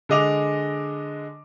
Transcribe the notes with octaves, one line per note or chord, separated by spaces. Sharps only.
D3 G#3 D#5 D6 F7